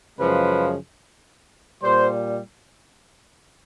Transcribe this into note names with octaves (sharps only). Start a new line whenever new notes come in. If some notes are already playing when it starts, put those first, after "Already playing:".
F#2 C#3 F3 G#3 B4
A#2 G3 C5